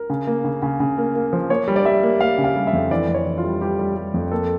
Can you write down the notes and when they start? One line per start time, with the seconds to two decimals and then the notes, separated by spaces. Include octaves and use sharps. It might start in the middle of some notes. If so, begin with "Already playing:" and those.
Already playing: A#4
0.10 C#3
0.27 A#3
0.44 C#3
0.62 C#3
0.80 C#3
0.98 A#3
1.15 A#3
1.33 F3
1.50 A#3 C#5
1.68 G3
1.76 D5
1.85 G3 E5
2.03 A#3
2.21 A#3 F5
2.38 C#3
2.44 F5
2.56 G3
2.67 E5
2.73 F2
2.91 E3 D5
3.08 F2
3.14 C#5
3.26 E3
3.38 F4
3.44 G3
3.61 G3 G4
3.79 G3
3.97 G3
4.14 F2
4.31 A#3 A4